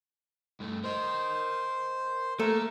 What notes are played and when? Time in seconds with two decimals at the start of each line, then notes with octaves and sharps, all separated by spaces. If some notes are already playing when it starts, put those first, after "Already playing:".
0.60 G2 A3
0.84 A#4 C5 D#5
2.40 A3 A#3 A#4